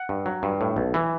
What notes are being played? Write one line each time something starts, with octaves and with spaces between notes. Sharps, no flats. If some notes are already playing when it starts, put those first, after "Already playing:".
Already playing: F#5
G2
F#3
G2
A2
B1
E3